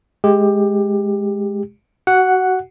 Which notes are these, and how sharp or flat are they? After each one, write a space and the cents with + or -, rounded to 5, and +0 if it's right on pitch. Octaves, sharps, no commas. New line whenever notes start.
G#3 +10 G4 +20
F#4 +20 F#5 +0